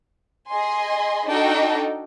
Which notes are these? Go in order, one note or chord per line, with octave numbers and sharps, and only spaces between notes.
G#4 D#5 G#5 C6
D4 D#4 F#4 A4 G5